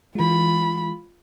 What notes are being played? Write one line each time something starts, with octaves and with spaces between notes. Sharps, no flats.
E3 G#3 F4 B5